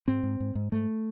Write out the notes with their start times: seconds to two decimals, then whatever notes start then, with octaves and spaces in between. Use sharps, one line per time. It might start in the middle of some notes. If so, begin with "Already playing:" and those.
0.08 G#2 C4
0.23 G#2
0.40 G#2
0.55 G#2
0.72 G#2 A3